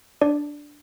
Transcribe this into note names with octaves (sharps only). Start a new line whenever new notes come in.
D4 D5